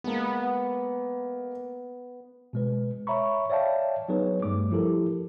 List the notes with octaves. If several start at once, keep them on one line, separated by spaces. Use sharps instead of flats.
G#3 A#3 B3
B2 G#3 B4
C#5 E5 A#5 B5 C#6
C#5 D5 E5 F5 G5 A5
F#3 B3 D#4 G#4 B4 C#5
G2 G3 A3 D6
F3 E4 G4 A4 A#4